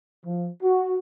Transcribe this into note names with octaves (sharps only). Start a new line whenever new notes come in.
F3
F#4